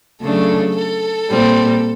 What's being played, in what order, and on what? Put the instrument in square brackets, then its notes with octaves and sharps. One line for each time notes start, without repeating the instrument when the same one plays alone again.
[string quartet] C#3 F#3 A3 D4 A4
A4
A#2 G3 C4